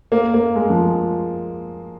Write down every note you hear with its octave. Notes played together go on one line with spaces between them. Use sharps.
A#3
A#3
G#3
F3
G#3